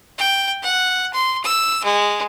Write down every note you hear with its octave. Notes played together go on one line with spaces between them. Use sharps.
G5
F#5
C6
E6
G#3